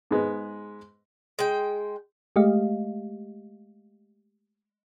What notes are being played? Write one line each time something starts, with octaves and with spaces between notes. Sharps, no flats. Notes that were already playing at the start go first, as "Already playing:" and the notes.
G#2 G#3 B3
G#3 G5
G#3 A3 G4 D#5 F5